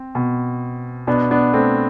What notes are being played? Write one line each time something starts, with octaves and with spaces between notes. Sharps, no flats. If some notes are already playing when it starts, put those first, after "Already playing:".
Already playing: C4
B2
B2 B3 D4
B3 D4
A3 C4